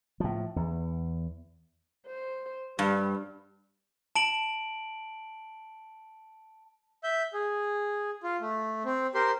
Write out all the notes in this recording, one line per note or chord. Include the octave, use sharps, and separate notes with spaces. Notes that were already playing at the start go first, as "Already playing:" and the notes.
A2 F3
E2
C5
G2 G3
A5 D7 F#7
E5 G6
G#4
F4
A3
C4
G4 A#4 C5 C6